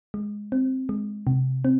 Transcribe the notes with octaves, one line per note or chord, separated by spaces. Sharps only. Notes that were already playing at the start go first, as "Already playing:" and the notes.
G#3
C4
G#3
C3
C4